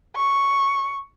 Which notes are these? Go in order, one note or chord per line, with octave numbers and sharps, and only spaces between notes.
C#6